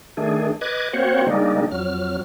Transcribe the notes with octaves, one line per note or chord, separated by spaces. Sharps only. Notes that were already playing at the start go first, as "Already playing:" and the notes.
D#3 A3 D4 G#4
B4 D#5 D6 F#6 G#6
A#3 C4 F#4 C5 C#5 F#5
C#3 G3 G#3 A#3 D4 D#4
F2 F#3 F6